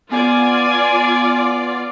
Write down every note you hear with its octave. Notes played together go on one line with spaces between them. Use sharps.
B3 F4 D5 G#5